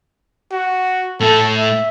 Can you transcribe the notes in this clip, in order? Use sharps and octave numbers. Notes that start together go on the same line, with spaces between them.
F#4
A2 A3 A4
E5